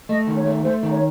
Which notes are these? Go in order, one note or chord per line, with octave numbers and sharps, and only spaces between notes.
A3 D#5
D#3
C#5
A3
A3 C5
D#3
C#5